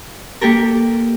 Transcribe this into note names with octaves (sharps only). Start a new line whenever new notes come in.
A#3 G4 A4 A#4